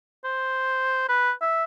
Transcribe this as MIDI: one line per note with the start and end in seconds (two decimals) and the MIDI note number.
0.24 1.06 72
1.09 1.31 71
1.42 1.64 76